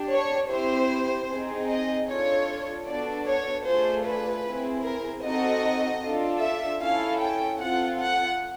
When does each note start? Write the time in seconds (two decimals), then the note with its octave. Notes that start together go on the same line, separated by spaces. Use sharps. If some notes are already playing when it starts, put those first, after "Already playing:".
Already playing: D4 G4
0.11 C#5
0.49 C4 E4 G4 C5
1.29 C4 D#4 G#4
1.68 D#5
2.07 D4 F4 A4 C#5
2.86 B3 D4 F#4 A4 D5
3.27 C#5
3.65 A3 D4 F4 G#4 C5
4.05 B4
4.45 C4 E4 G#4
4.84 A#4
5.23 C4 D#4 F#4 A4 D#5
6.03 D4 F4 A4
6.41 E5
6.80 C#4 E4 A4 F5
7.20 G5
7.60 C4 F4 A4 F#5
7.99 F#5